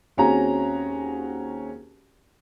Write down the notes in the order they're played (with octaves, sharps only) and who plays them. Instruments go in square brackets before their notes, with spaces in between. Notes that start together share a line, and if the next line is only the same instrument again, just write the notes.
[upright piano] D#2 C4 C#4 F#4 G#4 A#5